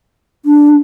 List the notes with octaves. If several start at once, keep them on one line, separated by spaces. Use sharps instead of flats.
D4